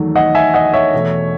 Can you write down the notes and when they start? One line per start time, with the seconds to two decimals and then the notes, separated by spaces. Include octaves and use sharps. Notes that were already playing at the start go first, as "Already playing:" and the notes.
Already playing: E2 D#3 F#3 A3
0.15 D#5 F#5
0.35 E5 G#5
0.54 D#5 F#5
0.74 C#5 E5
0.93 E2 B2 A3